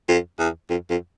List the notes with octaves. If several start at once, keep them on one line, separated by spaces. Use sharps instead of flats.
F2
E2
F2
F2